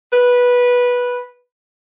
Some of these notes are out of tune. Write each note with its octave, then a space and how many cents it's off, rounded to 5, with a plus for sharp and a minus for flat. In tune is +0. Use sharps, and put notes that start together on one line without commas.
B4 -10